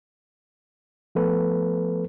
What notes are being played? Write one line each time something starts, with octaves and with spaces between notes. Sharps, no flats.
F3 A3 B3 A4 B4